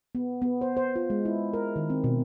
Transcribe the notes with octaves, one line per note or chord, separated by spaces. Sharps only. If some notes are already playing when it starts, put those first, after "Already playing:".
B3
B3
C5
C5
F4
G#3
E4
A#4
D#3
C4
B2